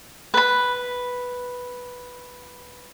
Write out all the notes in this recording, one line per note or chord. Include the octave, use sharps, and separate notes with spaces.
B4 B5